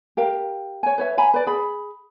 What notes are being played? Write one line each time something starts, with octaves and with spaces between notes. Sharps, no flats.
G4 A#4 F5
C#5 G#5
B4 C#5 E5
F5 G#5 A#5 B5
B4 D5
G#4 B5